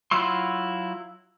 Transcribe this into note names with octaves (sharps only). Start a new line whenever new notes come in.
F#3 E4 F4 E5 C6